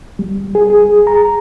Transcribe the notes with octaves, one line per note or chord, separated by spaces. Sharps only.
G3
G#4
G#4
A#5